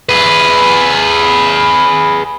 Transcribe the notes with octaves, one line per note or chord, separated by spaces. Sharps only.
G#4 B4